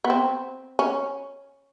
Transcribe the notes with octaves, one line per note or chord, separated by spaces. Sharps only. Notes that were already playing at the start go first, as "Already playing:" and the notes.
B3
C4
C#4